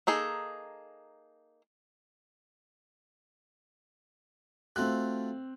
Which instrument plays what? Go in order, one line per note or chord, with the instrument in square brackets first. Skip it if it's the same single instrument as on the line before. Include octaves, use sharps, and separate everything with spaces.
[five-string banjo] A#3 D#4 G#4 A4
[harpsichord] A3 F4 F#4 [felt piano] C4 F#6